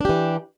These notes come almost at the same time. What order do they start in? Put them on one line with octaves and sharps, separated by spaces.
D4 G4 E3